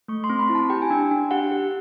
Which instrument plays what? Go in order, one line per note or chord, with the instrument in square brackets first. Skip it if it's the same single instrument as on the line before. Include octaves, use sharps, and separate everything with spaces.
[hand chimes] A3 C#6
C6
C4
B5
E4
A5
G4 G5
G#5
D4 G5
D4
G4 F#5
G4